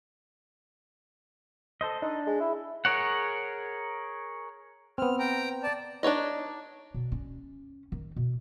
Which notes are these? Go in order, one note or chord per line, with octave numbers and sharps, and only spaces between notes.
A4 C5 D#5
D4 D#4
G#3
E4
G#4 A#4 C#5 F#5
B3 C4 F6
G5 A#5
D5 A5
D4 D#4 C#5 D#5
B2
C#4
D#3
B2